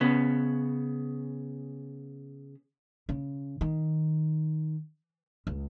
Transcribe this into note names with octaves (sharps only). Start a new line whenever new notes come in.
C#3 B3
C#3
D#3
C#2